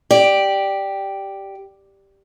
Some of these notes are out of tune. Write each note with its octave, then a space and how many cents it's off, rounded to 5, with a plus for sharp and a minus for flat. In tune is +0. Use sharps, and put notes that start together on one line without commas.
G4 +0 D5 +5